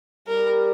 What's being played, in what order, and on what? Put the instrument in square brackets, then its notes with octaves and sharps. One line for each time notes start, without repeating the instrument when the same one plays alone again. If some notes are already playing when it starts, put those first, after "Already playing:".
[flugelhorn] G3 [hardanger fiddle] A#4